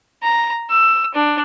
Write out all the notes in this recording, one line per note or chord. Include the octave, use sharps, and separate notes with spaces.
A#5
E6
D4